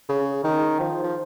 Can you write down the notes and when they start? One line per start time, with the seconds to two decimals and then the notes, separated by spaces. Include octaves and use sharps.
0.09 C#3
0.44 D#3
0.80 F3
1.03 F3